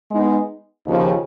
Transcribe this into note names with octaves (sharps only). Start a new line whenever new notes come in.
G#3 B3 D#4
D#2 C#3 F3